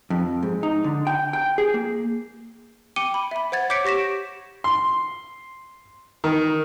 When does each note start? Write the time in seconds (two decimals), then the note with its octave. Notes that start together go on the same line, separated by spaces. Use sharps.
0.10 F2
0.43 G#2
0.63 D#4
0.84 D3
1.07 G5
1.33 G5
1.58 G#4
1.74 A#3
2.96 G5 D6 C#7 D#7 G7
3.14 B5
3.31 E5 B5
3.52 C5 F#5 G#6 A6
3.70 C#5 D6 G6 B6 C#7 D7
3.85 G4 C#6 A#6 B6 E7
4.64 C6
6.24 D#3